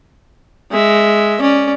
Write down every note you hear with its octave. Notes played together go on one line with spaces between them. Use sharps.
G#3 E5
C#4 D5